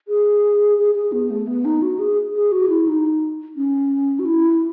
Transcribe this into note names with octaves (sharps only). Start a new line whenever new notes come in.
G#4
G#4
G#4
B3
A3
B3
D#4
F#4
G#4
G#4
F#4
E4
D#4
C#4
F#4
E4